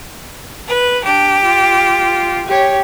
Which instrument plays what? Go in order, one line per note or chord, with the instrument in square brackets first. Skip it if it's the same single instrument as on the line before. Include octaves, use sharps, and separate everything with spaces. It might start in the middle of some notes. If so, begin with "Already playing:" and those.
[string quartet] B4
[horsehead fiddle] D4 [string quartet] G4
[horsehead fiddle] F4
G4 C#5